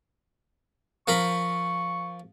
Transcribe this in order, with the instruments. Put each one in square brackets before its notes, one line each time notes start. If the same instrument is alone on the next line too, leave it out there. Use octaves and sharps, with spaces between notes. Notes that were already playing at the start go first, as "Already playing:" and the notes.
[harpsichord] F3 A#4 B5 [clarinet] C#6